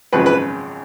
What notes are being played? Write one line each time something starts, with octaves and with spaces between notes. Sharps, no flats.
G#1 F#2 C#3 F3 B4
B4